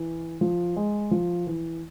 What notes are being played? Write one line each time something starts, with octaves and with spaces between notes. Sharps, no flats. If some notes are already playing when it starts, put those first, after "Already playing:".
Already playing: E3
F3
G#3
F3
E3